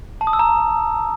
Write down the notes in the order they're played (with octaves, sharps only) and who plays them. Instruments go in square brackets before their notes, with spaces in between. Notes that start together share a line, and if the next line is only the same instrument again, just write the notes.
[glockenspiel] A5
D#6
E6
A#5